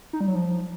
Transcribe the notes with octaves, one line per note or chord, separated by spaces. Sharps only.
D#4
G3
F#3
F3